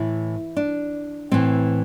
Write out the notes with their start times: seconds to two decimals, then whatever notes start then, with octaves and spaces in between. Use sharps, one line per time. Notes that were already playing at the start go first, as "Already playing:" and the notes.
Already playing: A2 E3 E4
0.57 D4
1.31 A2 E3 C4